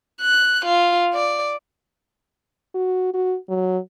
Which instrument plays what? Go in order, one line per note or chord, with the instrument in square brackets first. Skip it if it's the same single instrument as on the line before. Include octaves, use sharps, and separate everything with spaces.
[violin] F#6
F4
D5
[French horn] F#4
F#4
F#3